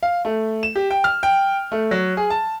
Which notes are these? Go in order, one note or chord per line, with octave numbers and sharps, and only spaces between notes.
F5
A3
E7
G4
G5
F6
G5
A3
F#3
G#4
A5